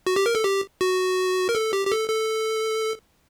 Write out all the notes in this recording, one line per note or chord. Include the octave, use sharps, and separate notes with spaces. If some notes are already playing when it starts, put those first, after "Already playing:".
F#4
G4
A#4
A4
G4
F#4
A#4
A4
G4
G4
A4
A4